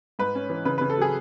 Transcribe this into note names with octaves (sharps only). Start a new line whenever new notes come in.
G#2 B4
C#4
E3
C#3 B4
C#3 B4
A4
F#3 G#4